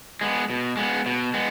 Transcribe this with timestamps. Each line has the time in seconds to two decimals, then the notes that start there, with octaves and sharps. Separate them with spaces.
0.21 G#3 B3
0.50 B2
0.77 G#3 B3
1.06 B2
1.34 G#3 B3